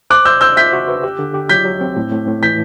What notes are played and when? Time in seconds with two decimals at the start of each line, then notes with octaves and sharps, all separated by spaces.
0.10 C5 D6 F#6
0.25 C5 E6 G6
0.41 C5 E6 G6
0.57 E5 G6 B6
0.73 F#4
0.88 B4
1.03 G4
1.19 D3
1.34 G4
1.49 F#3 G6 B6
1.65 F#3
1.81 C4
1.96 A2
2.12 A2
2.27 A2
2.43 E3 G6 B6